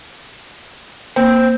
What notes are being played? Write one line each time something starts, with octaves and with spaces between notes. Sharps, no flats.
A#3 C4